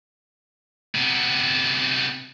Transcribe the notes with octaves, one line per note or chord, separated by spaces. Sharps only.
C3 B3